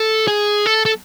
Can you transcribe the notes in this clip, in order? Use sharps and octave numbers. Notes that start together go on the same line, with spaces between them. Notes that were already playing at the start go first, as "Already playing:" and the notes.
Already playing: A4
G#4
A4
A4